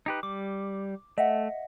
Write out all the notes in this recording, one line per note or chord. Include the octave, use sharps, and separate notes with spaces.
D#4 G4 B4
G3 D6
A3 D#5 E5 F#5